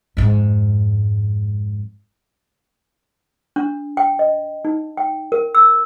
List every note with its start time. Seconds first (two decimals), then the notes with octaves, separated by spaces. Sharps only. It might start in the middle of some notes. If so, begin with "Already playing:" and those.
0.17 F2 G#2
3.56 D4
3.97 G5
4.19 D#5
4.65 D#4
4.97 G5
5.32 A#4
5.55 E6